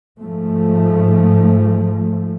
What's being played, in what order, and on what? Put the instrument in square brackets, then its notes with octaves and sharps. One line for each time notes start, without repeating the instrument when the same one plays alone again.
[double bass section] G#2 F3 A3